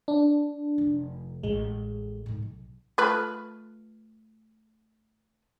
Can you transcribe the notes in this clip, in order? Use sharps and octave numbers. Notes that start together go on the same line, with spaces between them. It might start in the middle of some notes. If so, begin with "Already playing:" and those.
D4
F1
A1 A2 G#3
A2 D#4
B1
A3 F4 B4